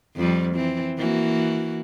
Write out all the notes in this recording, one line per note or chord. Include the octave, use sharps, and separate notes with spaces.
F2 F3 G3
E3 C4
E3 A#3 F#4